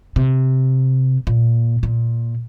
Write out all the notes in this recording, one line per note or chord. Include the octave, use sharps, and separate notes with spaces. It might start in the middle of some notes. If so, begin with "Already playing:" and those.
C3
A#2
A#2